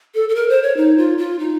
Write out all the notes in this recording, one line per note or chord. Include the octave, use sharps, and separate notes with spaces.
A4
A4
A#4
C5
C#5
D#4
F4
F4
D#4